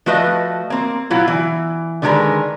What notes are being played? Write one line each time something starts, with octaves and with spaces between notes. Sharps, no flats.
F3 A3 F#4 B4 D#5
A#3 C4
B2 F#3 E4 F4
E3
D3 D#3 G#3 G#4 A#4 B4